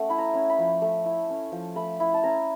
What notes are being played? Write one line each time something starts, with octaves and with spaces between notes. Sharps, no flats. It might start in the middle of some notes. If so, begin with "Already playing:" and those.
Already playing: A3 C#4 F#5
E4 B5
A#5
C#4
B5
F3
A3
E4
C#4
F3
A3 B5
E4
A5
C#4 A#5